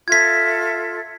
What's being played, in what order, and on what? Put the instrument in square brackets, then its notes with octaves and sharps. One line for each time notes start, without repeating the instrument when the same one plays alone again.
[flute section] F4 A4 E5 [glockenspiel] G#6 B6